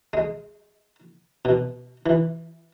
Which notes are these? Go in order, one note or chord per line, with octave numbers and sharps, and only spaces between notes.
G#3
B2
E3